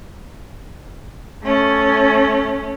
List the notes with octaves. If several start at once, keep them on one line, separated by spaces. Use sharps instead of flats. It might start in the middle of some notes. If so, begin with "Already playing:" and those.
A3 C#4